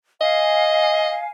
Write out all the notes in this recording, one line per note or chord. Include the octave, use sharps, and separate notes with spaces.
D#5 F5 G#5